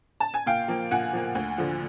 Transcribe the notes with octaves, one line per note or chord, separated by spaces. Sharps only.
A5
G#5
A#2 F5 G5
F3 A#3
A#2 F#5 G#5
F3 A#3
D2
D3 F3